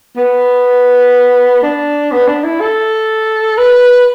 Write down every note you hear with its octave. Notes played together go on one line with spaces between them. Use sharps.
B3
D4
B3
D4
E4
A4
B4